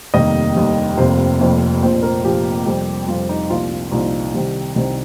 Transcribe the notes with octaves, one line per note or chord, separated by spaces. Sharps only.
F1 D#2 D#3 G3 A#3 D#5
F1 D#2 D#3 G3 A#3
F1 F2 C3 F3 A#3 C5
F1 F2 C3 F3 A#3
A#1 A#2 F3 C5
A#4
A#1 A#2 F3 G4
F2 C3 G3
F2 C3 G3 F4
D#4
C2 A#2 F3 A#3 F4
F4
C2 A#2 F3 A#3 D#4
C2 C3 D#3 G3
C2 C3 D#3 G3